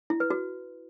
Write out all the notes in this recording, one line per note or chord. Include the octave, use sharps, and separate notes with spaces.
E4
B4
F#4